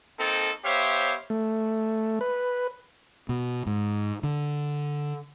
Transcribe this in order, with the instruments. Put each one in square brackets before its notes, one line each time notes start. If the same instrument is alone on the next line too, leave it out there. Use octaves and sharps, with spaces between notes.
[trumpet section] A#3 C4 D#4 A4
B3 G4 C5 C#5 E5 F5
[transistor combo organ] A3
B4
[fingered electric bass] B2
G#2
D3